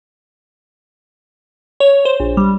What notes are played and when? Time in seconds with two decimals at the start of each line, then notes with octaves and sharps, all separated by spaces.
1.80 C#5
2.05 C5
2.20 A#1
2.37 G3